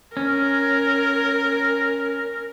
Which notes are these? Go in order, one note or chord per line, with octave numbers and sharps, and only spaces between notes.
C#4 A#4